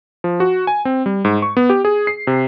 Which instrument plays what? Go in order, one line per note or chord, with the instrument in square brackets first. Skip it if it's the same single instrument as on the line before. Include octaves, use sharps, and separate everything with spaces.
[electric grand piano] F3
F#4
G#5
C4
G3
G#2
C#6
B3
G4
G#4
C7
C3